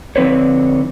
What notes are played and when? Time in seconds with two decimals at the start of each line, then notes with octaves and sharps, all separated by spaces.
0.16 D3 F3 C4 B4 C#5